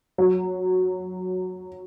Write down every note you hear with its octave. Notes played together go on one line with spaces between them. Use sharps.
F#3